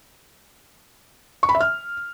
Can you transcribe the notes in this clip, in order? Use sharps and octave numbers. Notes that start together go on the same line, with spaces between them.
C#6
B5
E5
F6